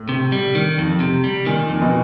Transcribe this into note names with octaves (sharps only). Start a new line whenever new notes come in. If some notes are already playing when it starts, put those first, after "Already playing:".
Already playing: A2
C3
G3
D#3
F2
C3
G3
A#2 D#3
F2
B2